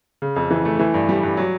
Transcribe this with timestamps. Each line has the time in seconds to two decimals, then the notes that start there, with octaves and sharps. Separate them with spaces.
0.22 C#3
0.36 F2
0.51 E3
0.65 A3
0.79 E3
0.94 G2
1.09 G3
1.23 G2
1.37 F#3